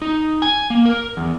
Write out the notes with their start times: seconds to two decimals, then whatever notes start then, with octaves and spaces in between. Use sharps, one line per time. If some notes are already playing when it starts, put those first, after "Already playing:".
0.02 D#4
0.42 G#5
0.70 A#3
0.86 A#4
1.17 E2